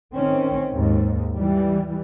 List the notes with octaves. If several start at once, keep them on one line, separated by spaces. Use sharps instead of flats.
D#3 C4 C#4
D#2 G#2
E3 G3